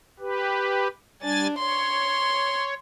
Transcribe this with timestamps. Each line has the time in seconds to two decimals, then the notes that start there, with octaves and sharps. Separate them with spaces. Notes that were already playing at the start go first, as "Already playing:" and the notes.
0.19 G4 B4
1.22 G3 D4 G#5 A6
1.58 C#5 C6